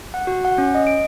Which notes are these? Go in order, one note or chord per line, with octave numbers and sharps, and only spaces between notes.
F#5
F#4
F#5
C#4
D#5
D7